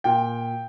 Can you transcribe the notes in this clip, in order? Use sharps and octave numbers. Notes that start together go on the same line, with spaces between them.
A#2 G5